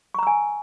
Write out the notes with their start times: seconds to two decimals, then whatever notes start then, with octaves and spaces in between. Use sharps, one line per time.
0.14 C#6
0.19 A#5
0.23 E6
0.27 G#5